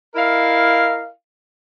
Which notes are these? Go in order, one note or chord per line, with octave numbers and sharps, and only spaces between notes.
E4 A#4 D#5 F5